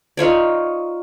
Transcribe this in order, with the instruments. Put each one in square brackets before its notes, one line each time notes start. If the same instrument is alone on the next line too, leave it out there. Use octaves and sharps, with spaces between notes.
[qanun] D#4 F4 C#5 D5